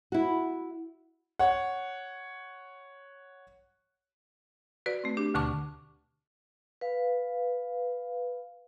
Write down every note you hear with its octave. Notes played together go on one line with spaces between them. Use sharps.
E4 F#4
C#5 F#5
F#4 B4 D5
A3 C4
D4 G4
D2 B2 D3 A5 C#6 D6
B4 F5